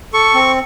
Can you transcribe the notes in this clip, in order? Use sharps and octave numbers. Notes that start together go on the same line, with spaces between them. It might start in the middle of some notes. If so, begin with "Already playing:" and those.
A4 C#6
C4